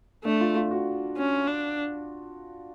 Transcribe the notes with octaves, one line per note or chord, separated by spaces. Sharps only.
A3 D4
F4
F4
F#4
C#4
D4